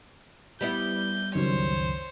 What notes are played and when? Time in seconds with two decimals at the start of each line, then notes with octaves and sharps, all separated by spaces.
0.61 G3 B3 E4 G6
1.35 C#2 F#2 D#3 C5 C#5